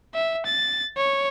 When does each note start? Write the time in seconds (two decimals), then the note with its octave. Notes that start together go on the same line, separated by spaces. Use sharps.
0.14 E5
0.46 A6
0.97 C#5